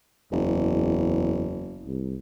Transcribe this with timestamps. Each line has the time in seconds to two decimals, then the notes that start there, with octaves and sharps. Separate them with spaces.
0.32 F#1 E2
1.86 C2